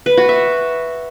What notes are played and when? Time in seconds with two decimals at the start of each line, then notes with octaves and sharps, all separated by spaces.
0.06 B4
0.17 F#4
0.29 E5